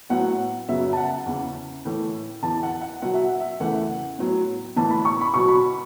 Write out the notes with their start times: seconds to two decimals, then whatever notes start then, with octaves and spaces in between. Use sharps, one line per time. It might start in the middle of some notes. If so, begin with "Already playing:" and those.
0.09 A2 F#3 B3 F#5
0.69 F#2 C#3 F#3 B3 E5
0.93 A5
0.97 F#5
1.26 E2 C#3 E3
1.85 A2 E3 A3
2.43 E2 E3 B3 A5
2.63 F#5
2.81 F#5
3.02 B2 F#3 B3 F#5
3.14 E5
3.40 E5
3.60 E2 C#3 E3 A3 F#5
4.18 A2 F#3 B3
4.76 A2 E3 B3 A5
4.91 B5
5.05 C#6
5.21 B5
5.34 B2 F#3 B3 C#6
5.48 B5